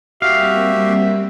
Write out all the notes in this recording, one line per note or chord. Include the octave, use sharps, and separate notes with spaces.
G3 A#3 C4 F#4 G4 E5 F5